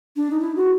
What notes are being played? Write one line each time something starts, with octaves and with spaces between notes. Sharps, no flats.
D4
D#4
E4
F#4